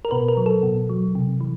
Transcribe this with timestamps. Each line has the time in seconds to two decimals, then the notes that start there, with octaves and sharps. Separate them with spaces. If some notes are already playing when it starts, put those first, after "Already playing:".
0.05 A#4
0.11 B2 B4
0.28 A#4
0.37 F#3
0.46 A4
0.63 B2
0.89 F#3
1.15 C3
1.41 E3